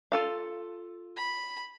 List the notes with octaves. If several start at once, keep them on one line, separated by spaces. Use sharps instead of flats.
F4 A4 F5
B5